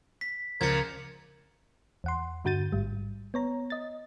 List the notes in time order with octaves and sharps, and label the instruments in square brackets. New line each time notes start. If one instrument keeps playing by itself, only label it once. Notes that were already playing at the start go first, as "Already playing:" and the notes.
[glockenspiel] B6
[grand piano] C#2 [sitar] A#2 F3 [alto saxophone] A#4 [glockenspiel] G#6 C#7
[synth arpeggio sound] E2 F#5 C6
G2 D3 F#4 G6 A6 D#7
A1 G#2 G3
B3 C#5 A#5
D#5 A6